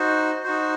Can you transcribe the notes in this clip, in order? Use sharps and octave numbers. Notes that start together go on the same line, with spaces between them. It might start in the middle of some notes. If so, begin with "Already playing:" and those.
Already playing: D#4 F#4 C5
D#4 F#4 C5